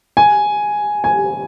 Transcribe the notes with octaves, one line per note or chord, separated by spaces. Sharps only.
G#5
G#5